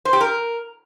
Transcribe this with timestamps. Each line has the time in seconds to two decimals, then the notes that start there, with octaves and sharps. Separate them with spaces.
0.05 C5
0.13 G4
0.21 A#4